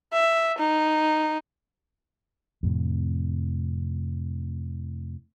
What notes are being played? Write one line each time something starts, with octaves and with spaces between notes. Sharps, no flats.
E5
D#4
F2 A2 C3